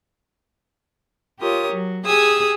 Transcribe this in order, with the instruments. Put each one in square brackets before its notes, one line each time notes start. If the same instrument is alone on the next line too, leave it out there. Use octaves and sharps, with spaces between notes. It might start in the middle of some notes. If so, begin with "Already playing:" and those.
[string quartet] F4 G4 A#4 C#5 D#6
F#3
G4 G#4 G#5 D#6 E6